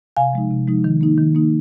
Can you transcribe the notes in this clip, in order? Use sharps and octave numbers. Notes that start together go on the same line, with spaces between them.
C3 F5 G#5
F3 G#3 D#4
C3
F3 G#3 D#4
D#3
A#3 D#4
D#3
A#3 D#4